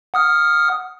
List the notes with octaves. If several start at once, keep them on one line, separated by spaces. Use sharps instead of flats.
F#5 D#6 F6